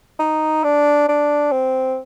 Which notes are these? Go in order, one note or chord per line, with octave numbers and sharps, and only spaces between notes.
D#4
D4
D4
C4